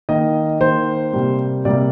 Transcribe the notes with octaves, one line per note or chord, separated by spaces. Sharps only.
D#3 A#3 D#5
D#3 A#3 C5
C3 G3 A#3
C3 G3 A#3 D5